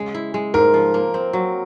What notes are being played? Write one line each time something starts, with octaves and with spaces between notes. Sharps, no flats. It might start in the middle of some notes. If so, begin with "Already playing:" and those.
Already playing: C#3 G#3
E4
G#3
G#2 A#4
F3
A#3
C4
F#3